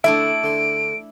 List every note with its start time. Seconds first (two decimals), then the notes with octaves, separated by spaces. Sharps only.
0.04 D3 A3 D4 E4 E5 D7
0.43 D3 C6